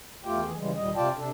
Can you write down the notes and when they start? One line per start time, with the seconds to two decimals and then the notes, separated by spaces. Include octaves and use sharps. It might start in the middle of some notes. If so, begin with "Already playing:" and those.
0.25 E2 A3 F4 G4 G5
0.44 E3 G#4
0.57 C#3 E3 G3 G#3
0.75 D#2 A#2 G3 D#5
0.95 C3 F4 D5 G5 A5
1.17 C3 D4 A4